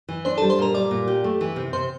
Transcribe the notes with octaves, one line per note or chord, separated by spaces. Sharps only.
E3
D4 C5 C6
A4 A5
G3
C5 C6
A#2 A#4 A#5
G3 D5 D6
A#2
G4
A3
E3
C3
C3 C5 C6